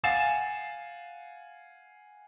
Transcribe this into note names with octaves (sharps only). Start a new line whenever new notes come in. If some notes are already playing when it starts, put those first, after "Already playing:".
F5 F#5 G#5 A6 C7 E7